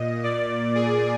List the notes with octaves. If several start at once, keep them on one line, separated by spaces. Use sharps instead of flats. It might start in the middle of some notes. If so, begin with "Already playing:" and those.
Already playing: A#2 D#5
A#2 D5
G#4